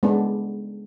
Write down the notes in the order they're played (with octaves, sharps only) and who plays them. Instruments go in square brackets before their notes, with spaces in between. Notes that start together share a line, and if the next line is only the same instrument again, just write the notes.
[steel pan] G#3 B3 D4